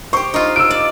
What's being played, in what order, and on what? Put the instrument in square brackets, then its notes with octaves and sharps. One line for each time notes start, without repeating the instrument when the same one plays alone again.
[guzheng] G4 C5 [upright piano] C#6
[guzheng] D#4 F4
[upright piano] E6 D7
[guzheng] D5